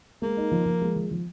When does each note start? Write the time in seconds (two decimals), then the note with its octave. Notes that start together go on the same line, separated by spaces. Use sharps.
0.22 G#3 A#3
0.37 D#4
0.52 F3
0.66 F3
0.82 G#3
0.96 F3
1.11 F3